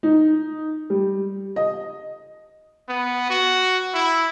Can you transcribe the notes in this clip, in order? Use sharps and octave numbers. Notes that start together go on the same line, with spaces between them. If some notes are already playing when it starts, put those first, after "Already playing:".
D#4
G3
D#5
B3
F#4
E4